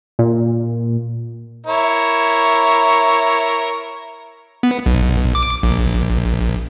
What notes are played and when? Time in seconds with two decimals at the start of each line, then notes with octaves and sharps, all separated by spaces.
0.19 A#2
1.66 E4 A#4 C#5
4.63 B3
4.86 B1
5.35 D6
5.63 A#1